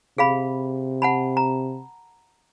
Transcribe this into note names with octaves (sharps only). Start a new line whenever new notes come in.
C3 G#4 F5 B5
F#5 A5 B5
A#5